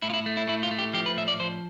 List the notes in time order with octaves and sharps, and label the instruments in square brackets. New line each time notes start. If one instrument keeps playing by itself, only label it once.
[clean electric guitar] A2 E4
F4
E4
A3
E4
A2 E4
F4
A3
G4
F3 G4
B4
A2 E5
D5
F3 C5